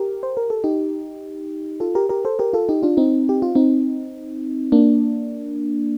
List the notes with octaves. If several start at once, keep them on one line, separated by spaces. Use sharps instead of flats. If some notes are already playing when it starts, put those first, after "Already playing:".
Already playing: G4 A#4
C5
A#4
A4
D#4 G4
F4 A4
G4 A#4
G4 A#4
A4 C5
G4 A#4
F4 A4
D#4 G4
D4 F4
C4 D#4
G4
F4
C4 D#4
A#3 D4